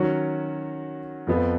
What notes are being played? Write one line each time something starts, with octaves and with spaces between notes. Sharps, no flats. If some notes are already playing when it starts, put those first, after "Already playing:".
Already playing: D#3 F#3 C#4 F#4
F2 F3 B3